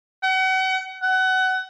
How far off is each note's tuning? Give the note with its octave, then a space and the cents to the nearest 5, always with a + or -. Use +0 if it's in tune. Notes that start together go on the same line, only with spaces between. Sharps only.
F#5 +35
F#5 +25